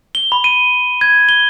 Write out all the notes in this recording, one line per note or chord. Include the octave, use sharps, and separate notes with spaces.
G7
B5
D#7
G#6
G7